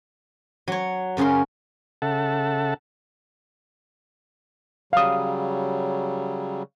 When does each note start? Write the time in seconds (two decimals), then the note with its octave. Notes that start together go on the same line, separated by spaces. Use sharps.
0.68 F#3 C#5
1.17 F#2 C#3 C#4 A#4 C6
2.02 C#3 A4 E5 F#5 A5
4.93 C#3 F#3 G3 F5 D#6